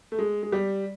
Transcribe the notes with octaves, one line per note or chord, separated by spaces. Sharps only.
A3
G#3
G#3
G3